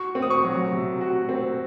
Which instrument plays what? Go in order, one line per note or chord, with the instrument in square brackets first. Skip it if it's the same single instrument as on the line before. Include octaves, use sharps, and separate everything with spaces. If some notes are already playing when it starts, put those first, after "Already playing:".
Already playing: [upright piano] F#4 [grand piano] C#6
[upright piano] C4
[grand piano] D#6
C#6
[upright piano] F#3
C3
F#4
C4